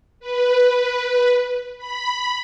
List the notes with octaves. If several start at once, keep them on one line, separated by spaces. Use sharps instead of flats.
B4
B5